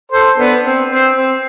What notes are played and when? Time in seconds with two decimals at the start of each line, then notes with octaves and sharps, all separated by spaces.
0.11 A4 C5
0.37 B3 D4
0.64 C4
0.90 C4
1.16 C4